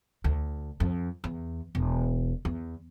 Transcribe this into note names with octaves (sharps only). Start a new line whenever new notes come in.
D2
F2
E2
E1
E2